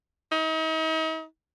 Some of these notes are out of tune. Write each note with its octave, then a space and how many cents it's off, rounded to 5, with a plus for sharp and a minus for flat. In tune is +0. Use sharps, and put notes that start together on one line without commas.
D#4 +40